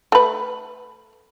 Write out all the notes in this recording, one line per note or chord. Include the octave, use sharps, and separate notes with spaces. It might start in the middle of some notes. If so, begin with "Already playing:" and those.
A3 B4